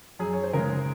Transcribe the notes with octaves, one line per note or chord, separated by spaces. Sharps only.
F#2 G#4
C#5
C5
C#3 G#3 A#4